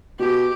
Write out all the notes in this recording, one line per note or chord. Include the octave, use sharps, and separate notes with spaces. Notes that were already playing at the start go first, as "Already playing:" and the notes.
B2 G4